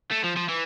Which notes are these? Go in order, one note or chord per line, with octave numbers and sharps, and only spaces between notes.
A3
F3
F3
E3